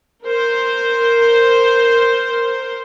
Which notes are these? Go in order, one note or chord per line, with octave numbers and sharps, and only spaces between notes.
A#4 C5